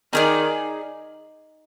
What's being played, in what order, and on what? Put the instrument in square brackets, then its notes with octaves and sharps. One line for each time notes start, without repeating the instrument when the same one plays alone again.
[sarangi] D#3 [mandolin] D#4 G#4 D5